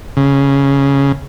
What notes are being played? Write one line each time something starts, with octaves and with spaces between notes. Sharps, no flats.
C#3